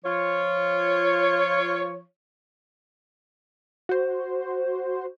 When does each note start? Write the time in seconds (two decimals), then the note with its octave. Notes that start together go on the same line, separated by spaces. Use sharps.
0.05 F3 F4 C#5
3.89 F#4 C5